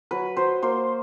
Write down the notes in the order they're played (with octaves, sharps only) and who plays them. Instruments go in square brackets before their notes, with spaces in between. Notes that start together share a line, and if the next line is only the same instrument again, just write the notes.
[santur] F#3 B4
F#3 C5
A#3 C5